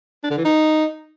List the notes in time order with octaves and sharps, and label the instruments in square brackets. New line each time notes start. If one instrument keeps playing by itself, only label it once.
[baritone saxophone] D4
D3
E3
D#4